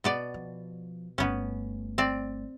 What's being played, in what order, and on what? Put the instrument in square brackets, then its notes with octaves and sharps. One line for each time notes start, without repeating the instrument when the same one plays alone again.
[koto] B2 B3 D5
[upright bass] F3
[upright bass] G1 A3 [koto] B3 C#4
[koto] C4 D5